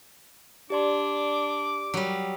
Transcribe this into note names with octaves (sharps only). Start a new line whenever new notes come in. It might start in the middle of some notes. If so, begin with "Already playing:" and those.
D4 G4 D5 C6 D6
F#3 G3